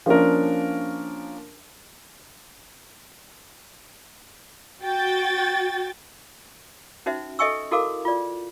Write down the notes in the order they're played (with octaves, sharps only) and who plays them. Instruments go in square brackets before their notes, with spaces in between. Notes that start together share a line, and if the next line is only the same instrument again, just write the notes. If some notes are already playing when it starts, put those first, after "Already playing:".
[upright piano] F3 A#3 C#4 D4 A#4
[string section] F#4 G5 A6
[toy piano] C#4 D#4 F#4 C5 E5
A4 D#5 E5 G#5 C#6 E6
E4 F#4 A4 A#4 F5 D6
F4 D5